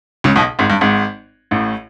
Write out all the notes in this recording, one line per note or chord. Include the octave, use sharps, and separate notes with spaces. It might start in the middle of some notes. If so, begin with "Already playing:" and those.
C#2 C#3
B1 B2
G#1 G#2
G2
G#1 G#2
A1 A2